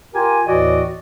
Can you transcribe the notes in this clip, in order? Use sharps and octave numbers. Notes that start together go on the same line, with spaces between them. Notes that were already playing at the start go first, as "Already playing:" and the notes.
F4 G4 A#4 G#5
D#2 A2 E3 F#4 D5 D#5